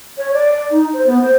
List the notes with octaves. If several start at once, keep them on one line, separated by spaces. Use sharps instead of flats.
C#5
D5
D#4
C5
B3
C5